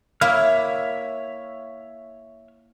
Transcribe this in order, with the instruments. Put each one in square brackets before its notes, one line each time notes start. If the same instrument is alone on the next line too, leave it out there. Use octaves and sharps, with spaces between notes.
[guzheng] A#3 E4 [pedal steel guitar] C#5 E5 F6